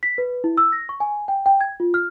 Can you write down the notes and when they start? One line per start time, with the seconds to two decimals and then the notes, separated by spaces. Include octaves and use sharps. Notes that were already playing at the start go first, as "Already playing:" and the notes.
0.03 B6
0.18 B4
0.44 E4
0.57 E6
0.72 A#6
0.89 C#6
1.00 G#5
1.28 G5
1.46 G5
1.61 G#6
1.80 F4
1.94 F6